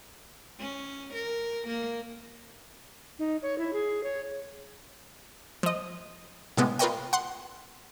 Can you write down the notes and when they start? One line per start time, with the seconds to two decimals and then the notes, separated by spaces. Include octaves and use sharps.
0.60 C#4
1.14 A#4
1.68 A#3
3.19 D#4
3.42 C#5
3.58 E4
3.73 G#4
4.03 C#5
5.63 F3 D#5
6.57 A2 C3 G#3 B3
6.79 F4 A#4 B4 C#5 D#5 G5
7.13 F#5 C6